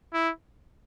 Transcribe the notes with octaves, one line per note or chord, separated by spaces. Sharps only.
E4